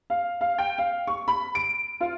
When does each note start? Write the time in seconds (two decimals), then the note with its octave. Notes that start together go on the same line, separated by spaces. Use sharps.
0.10 F5
0.41 F5
0.58 G5
0.78 F5
1.07 C#6
1.28 B5
1.55 D7
2.00 F4